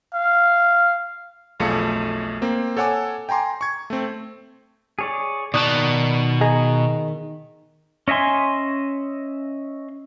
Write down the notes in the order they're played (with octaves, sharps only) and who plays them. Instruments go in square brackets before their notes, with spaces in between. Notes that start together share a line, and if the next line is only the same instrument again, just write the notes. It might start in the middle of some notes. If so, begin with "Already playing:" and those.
[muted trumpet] F5
[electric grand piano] B1 F2 A3 G#4 F5 C#7
A#3 C4
A4 C#5 F#5 G#5 D6 E6
G5 G#5 A#5 C6 D6
C#6 G#6
A3 C4
[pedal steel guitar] G#4 C#5 D5
[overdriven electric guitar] B2 A5 [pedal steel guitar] D#3 F#6 [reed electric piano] D5 C#6 D#6
[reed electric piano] G#4 D#5 A#5
[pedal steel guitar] C#4 D#5 E5 G#5 C6